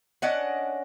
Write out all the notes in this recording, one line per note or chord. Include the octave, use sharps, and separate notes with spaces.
C#4 D4 D#5 F#5